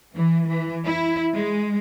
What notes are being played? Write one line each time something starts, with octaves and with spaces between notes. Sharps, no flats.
E3
E3
E4
G#3